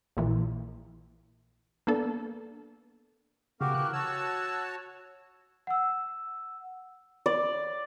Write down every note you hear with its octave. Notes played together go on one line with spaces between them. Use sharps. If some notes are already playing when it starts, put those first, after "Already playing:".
A#1 A#2 E3
A#3 B3 D4 A4
C#3 B3 F#4 G4 A#4 F5
E3 A#4 F#6
F#4 C#5 A5 E6
F#5 E6
D5